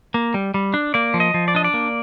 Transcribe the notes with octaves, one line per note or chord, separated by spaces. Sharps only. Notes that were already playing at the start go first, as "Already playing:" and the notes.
A#3
G3
G3
D4
A#3 D5
F3
D#5
F3
D5
D4 D#5
D5
A#3